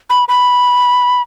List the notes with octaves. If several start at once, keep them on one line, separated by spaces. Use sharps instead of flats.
B5
B5